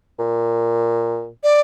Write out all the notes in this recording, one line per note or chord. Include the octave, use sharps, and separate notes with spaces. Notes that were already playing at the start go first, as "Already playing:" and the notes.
A#2
D5